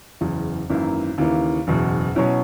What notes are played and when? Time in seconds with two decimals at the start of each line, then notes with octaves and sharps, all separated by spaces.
0.21 F#1 E2 C#3 E3
0.70 G#1 F#2 E3 A#3 E4
1.18 D#2 C#3 E3 A#3 E4
1.67 F#1 E2 B2
2.15 B2 F#3 C#4 E4